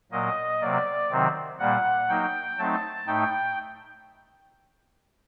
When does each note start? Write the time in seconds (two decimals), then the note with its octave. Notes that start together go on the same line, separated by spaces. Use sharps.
0.12 A#2 F#3 A#3 D#5
0.61 C3 F#3 A#3 D5
1.10 C3 D#3 F#3 C4
1.59 A#2 G3 A#3 F#5
2.09 F#3 A#3 D#4 G5
2.58 F#3 A3 C4 D#4 A5
3.07 A2 A3 D#4 G5